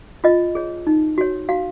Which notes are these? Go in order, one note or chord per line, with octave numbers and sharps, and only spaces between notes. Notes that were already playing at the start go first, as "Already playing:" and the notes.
F4 D#5
G#4 C#5
D#4
F#4 C#5
F#4 F5